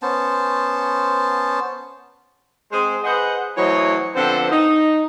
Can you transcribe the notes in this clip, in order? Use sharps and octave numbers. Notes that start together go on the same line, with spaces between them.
B3 C#4 C5 A5
G#3 C4 G#4 C5
G#4 B4 C5 D#5 F#5
E3 F#3 A3 C5 C#5 D#5
D3 F3 B3 C4 A4 C5
D#4